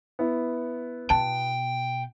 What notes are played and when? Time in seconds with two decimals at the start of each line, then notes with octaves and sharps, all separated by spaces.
0.19 B3 E4
1.10 B2 G5 A5